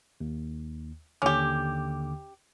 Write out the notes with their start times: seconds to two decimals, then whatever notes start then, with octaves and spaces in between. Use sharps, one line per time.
0.21 D#2
1.22 D#2 D3 C#4 G4 D6